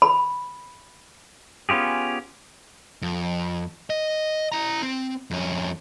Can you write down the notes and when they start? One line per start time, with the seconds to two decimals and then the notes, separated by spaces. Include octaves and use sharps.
0.02 B5
1.69 B3 C#4 F4 G4 G#4
3.02 F2
3.90 D#5
4.52 E4 A#5
4.82 C4
5.31 F2 C#4